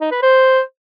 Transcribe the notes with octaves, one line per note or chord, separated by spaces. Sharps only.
D#4
B4
C5